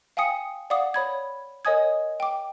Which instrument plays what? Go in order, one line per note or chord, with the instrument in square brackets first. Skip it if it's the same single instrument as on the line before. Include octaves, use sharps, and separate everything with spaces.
[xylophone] F5 G5 G#5 D#6 C#7
D5 F5 F#5 D6 D#6
C#5 B5 G#6
A#4 C#5 D#5 G#5 D#6 G#6
G5 D6